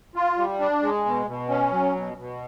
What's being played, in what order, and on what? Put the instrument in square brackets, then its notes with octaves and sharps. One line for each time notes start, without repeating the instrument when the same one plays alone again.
[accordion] F4
G3
D4
G#3
B2
B2
C#4
F#3
B2
B2